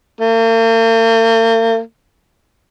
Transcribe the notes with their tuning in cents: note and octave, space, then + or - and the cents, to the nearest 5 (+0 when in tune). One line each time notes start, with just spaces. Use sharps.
A#3 -45